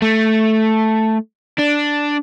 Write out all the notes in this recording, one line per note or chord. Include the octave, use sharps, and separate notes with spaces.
A3
D4